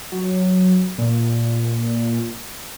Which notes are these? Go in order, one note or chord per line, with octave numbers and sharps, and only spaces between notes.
F#3
A#2